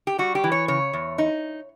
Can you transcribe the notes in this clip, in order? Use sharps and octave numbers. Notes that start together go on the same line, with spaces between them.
G4
G3 F#4
G4
E3
C#5
C#3 C#5
E2
D#4